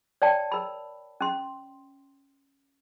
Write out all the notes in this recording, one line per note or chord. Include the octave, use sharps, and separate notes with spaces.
C#5 D5 G5 A5
A#4 B5
C#4 C6